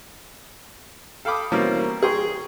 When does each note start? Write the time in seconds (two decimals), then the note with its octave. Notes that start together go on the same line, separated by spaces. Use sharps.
1.25 A4 F5 G5 B5 D6 D#6
1.52 B2 E3 G3 A#3 C4 C#4
2.03 G#4 G5 C6 C#6